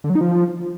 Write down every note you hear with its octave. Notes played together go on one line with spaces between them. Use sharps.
D3
F#3
D#4
F3